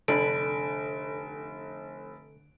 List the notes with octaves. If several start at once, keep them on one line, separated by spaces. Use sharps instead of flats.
F1 D3 A4 B4 D7